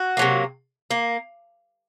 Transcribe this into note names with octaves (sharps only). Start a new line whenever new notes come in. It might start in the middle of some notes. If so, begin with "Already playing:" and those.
Already playing: F#4
C3 F#3 A#3
A#3